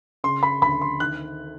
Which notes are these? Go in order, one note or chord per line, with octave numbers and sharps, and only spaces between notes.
C#3 C6
B5
D2 B5
C6
D#3 F#6